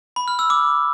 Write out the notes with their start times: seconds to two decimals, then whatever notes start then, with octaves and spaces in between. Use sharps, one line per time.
0.16 B5
0.28 F6
0.39 E6
0.50 D6